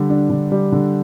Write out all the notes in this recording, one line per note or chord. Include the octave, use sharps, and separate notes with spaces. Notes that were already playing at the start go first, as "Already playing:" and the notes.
Already playing: D3 G3
D4
D3
G3
D3